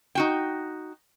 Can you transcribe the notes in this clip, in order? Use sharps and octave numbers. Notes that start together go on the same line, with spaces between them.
D#4 F#4 G5